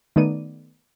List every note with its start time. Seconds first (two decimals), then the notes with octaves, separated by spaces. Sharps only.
0.16 D#3 A3 B3 D#4 D5 D#7